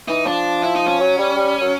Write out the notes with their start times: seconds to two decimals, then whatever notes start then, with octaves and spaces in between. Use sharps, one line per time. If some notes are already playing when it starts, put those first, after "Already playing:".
0.08 E3 D#4
0.26 F3 D4
0.63 E4
0.76 D#4
0.87 C#4
1.00 F#3
1.18 G3
1.36 G3
1.61 F#3